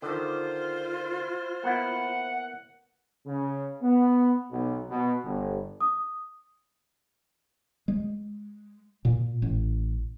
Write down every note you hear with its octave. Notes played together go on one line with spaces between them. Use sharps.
D3 D#3 F4 C5
A#3 B3 E4 F#5
C#3
B3
B1
B2
G1
D#6
G#3
A#2
A1